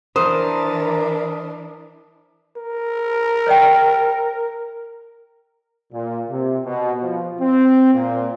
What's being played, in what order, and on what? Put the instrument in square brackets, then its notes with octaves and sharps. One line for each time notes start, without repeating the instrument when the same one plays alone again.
[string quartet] E3 D4 [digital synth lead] A#4 [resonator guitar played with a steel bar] C5 [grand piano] D#6
[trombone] A#4
[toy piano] C#5 D5 G5
[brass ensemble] A#2
C3
B2
F3
C4
A#2